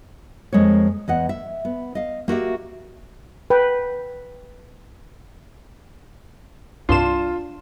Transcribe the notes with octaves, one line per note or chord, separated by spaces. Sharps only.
F2 G#3 A#3 C#5
E2 D#5 F#5
E5
B3
D#5 F5
A#3 F#4 G4 E5
B4 G5
C2 G2 D4 F4 C6 E7